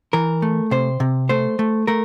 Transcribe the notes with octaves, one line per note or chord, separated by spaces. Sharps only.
E3 A#4
A3
C3 C5
C3
A3 C5
A3
A3 A#4